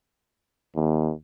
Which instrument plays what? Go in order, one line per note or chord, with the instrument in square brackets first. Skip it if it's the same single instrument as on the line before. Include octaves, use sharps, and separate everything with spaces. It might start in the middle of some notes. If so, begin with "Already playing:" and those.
[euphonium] D#2